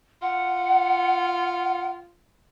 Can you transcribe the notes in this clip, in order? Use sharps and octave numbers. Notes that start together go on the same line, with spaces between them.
F4 F#5